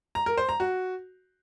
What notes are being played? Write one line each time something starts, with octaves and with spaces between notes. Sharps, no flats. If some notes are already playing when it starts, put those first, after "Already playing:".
A#5
A#4
C5
A#5
F#4